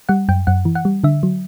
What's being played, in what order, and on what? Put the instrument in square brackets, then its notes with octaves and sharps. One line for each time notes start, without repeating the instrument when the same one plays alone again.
[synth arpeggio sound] G3 F#5
F#2 G5
F#2 F#5
E3
F#5
G3
D3 E5
F#3